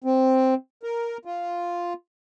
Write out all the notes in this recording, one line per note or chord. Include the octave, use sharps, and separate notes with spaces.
C4
A#4
F4